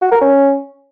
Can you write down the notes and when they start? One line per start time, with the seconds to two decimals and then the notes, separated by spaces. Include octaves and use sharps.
0.02 F#4
0.12 A#4
0.21 C#4